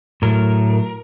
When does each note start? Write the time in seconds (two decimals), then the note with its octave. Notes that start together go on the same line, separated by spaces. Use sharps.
0.22 A2 F#3 A3 A#4